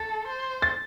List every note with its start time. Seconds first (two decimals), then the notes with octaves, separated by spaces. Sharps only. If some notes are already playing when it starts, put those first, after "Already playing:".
Already playing: A4 A6
0.27 C5
0.62 A6